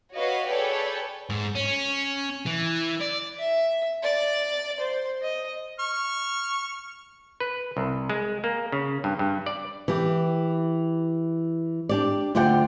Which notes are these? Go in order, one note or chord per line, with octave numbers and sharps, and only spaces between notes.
F#4 B4 C#5 D#5 F5
G#4 A4 B4 C#5 D5 G5
G#2
C#4
E3
D5
E5
D5
C5
D#5
C#6 F6
B4
C2
G#3
A#3
C#3
G2
G2
D5
E3 G4
D4 G4 D5
D2 F4 D5 F#5 G5